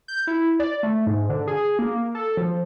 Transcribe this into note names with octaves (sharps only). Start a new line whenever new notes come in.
G6
E4
D5
A3
G#2
D3
G#4
A#3
A4
F3